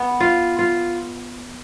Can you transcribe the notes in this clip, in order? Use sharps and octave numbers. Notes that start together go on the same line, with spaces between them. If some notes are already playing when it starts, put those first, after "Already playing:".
Already playing: B3
F4
F4